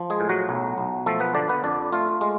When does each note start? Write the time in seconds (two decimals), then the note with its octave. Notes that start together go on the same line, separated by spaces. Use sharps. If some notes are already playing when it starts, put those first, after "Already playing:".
Already playing: F3
0.10 G#3 G#4
0.20 A2
0.29 F#3 F#4
0.49 B1
0.78 B1
1.06 F3 A3 A4
1.20 B3 B4
1.34 D3 D4 D5
1.49 B3 B4
1.64 F2 D4 D5
1.92 A3 F4 F5
2.21 G#3